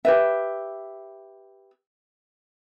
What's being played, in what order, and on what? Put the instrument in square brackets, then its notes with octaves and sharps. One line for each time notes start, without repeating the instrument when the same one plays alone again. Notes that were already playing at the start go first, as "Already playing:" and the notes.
[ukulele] G4 B4 E5